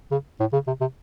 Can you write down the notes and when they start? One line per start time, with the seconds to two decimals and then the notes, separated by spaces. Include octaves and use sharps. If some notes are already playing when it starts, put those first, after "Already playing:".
0.11 C#3
0.40 A2
0.53 C#3
0.67 C3
0.81 C3